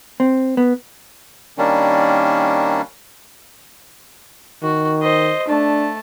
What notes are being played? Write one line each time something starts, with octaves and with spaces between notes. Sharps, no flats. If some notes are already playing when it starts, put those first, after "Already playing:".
C4
B3
D#3 G3 A#3 C#4 D4
D#3 F#4
C5 D#5
A3 D4 A5